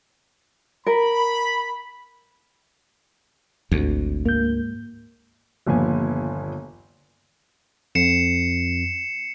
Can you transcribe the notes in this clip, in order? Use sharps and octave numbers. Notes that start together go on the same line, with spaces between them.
A#4 B5
G#1 D2
G#2 A#3 G6
G1 D#2 A#2 F3 B3 G#5
F2 C7 C#7 E7